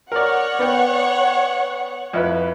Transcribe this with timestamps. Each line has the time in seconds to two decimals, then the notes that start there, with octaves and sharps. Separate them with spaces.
0.12 A#4 C#5 D5 F#5
0.59 B3 D5 G5
2.13 F2 E4 B4